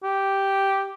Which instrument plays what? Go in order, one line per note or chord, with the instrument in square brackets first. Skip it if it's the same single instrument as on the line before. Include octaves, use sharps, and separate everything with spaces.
[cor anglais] G4